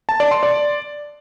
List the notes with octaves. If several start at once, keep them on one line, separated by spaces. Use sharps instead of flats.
A5
D5
C6
D5